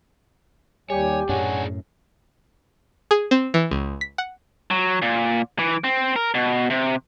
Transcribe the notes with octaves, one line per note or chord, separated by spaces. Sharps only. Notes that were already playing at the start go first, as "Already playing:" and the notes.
D#2 G3 G4 C#5 G#5
F#2 A2 D4 G#4 C#5 F#5 G#5
G#4
C4
E3
C#2
B6
F#5
F#3
A#2
E3
C4
A#4
B2
C3